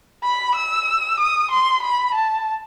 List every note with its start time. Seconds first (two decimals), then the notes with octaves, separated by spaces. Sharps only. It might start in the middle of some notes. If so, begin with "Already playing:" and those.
0.23 B5
0.55 E6
1.19 D#6
1.51 C6
1.82 B5
2.14 A5